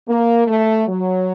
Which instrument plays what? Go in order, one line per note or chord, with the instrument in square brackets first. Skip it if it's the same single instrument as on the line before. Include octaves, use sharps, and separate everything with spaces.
[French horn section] A#3
A3
F#3